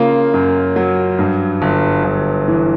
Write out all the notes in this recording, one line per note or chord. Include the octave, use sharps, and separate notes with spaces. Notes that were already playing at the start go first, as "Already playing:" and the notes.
Already playing: C#3 A#3 F4
F#2
F#3
G2
G1
G1
E3